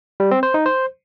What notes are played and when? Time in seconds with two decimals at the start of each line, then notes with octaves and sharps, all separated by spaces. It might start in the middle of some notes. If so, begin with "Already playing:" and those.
0.20 G3
0.31 C4
0.43 C5
0.54 D#4
0.66 C5